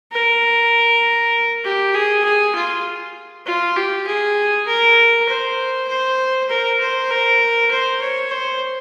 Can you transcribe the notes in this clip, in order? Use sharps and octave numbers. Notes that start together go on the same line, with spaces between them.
A#4
G4
G#4
G#4
F4
F4
G4
G#4
A#4
C5
C5
A#4
C5
A#4
C5
C#5
C5